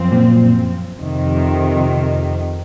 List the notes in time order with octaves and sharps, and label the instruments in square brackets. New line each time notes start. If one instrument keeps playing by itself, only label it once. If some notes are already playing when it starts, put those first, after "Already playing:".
Already playing: [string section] F#2 F3 C4
[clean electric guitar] A#2
[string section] F2 C3 D#3